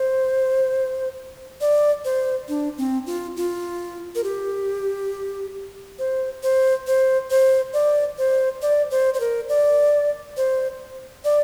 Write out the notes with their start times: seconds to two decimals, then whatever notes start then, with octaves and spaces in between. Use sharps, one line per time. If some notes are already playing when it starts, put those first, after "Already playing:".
Already playing: C5
1.61 D5
2.05 C5
2.49 D4
2.78 C4
3.06 F4
3.37 F4
4.15 A#4
4.24 G4
5.99 C5
6.43 C5
6.87 C5
7.30 C5
7.73 D5
8.18 C5
8.62 D5
8.91 C5
9.14 C5
9.20 A#4
9.49 D5
10.37 C5
11.24 D5